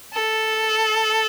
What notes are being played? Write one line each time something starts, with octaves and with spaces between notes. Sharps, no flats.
A4